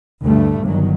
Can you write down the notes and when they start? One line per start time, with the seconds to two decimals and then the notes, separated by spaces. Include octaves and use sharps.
0.22 D2 G2 A#2 A3
0.63 G1 D#3 F#3